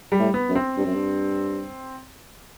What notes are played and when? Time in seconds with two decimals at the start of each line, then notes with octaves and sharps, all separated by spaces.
0.12 G3
0.19 A2
0.34 B3
0.49 F#2
0.55 C4
0.77 G2
0.86 F#2
0.95 G2